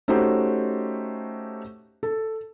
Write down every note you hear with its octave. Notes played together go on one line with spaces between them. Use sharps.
A3 C#4 D#4 F#4 G4 C5
A4